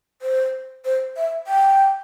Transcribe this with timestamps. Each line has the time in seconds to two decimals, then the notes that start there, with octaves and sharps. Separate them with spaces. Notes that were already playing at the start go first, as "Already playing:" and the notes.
0.22 C5
0.85 C5
1.17 E5
1.47 G5